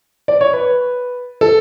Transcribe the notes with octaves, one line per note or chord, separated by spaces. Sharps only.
D5
C#5
B4
A4